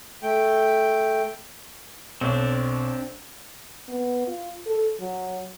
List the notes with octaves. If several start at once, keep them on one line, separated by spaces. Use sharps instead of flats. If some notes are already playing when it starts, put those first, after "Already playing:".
A3 G5
B1 C4 D4
B3
F4
A4
F#3